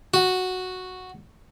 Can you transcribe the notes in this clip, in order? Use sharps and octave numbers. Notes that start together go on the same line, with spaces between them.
F#4